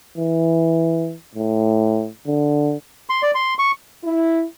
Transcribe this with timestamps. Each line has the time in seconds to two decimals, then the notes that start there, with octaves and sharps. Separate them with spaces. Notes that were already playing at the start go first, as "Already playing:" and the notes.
0.17 E3
1.35 A2
2.27 D3
3.10 C6
3.23 D5
3.35 C6
3.59 C#6
4.04 E4